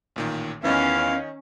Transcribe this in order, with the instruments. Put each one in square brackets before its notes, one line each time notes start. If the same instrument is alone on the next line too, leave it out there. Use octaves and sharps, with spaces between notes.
[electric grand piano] A1 A#2 D#3
[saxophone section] E2 [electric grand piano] D#3 D#5 [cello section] C#4 [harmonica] F5